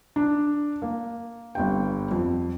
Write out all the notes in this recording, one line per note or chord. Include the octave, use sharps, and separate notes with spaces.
D4
A#3
G1 G2 G5
F2